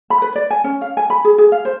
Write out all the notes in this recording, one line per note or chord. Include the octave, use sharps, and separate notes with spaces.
B5
B4
D5
G#5
C#4
F5
G#5
B5
G#4
G#4
F5
C5